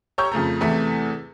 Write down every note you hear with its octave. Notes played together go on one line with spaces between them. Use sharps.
G4 C#5 A#5 C#6 E6 G6
F2 C#3 A3 A#5
E2 C3 E3 A3 E5